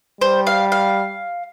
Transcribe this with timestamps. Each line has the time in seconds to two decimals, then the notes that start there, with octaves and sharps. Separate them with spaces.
0.21 G3 C5
0.47 F5
0.72 F5